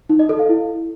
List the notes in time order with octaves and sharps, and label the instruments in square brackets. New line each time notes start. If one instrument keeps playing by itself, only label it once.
[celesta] D#4
D#5
A4
F5
E4